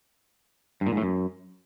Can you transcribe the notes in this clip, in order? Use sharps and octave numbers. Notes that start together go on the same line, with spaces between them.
G2
A#2
G#2
A2
F#2